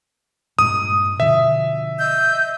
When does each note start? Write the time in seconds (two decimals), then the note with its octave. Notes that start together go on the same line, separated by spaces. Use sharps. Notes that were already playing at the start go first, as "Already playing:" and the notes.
0.59 G2 A#2 G#3 D#6
1.20 B2 D3 F3 E5
1.98 D#5 E6 G6